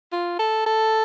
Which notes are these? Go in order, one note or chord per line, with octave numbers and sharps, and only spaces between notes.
F4
A4
A4